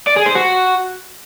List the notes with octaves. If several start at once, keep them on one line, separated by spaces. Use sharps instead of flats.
D5
G#4
C5
F#4